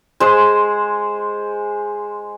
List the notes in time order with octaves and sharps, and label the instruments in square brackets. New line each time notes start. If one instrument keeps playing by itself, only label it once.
[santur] G#3 G#4 C5